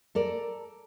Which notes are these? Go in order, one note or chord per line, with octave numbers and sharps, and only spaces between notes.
A4 A#4 D5